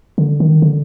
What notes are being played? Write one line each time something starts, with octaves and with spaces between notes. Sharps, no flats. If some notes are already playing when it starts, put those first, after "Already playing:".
D3
D#3
D3